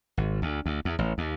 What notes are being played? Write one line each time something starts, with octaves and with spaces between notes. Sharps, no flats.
G#1
D2
D2
E2
A1
D#2